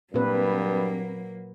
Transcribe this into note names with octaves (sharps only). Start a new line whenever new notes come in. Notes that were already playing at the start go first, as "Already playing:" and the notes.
G2 A#2 F#3 A#3 C4 B4